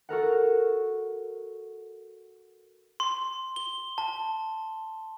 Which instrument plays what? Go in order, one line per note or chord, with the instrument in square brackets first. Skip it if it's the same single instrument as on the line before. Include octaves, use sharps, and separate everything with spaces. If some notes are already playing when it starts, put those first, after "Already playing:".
[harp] F#4 A4 A#4 F#5
[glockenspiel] C6
G7
A5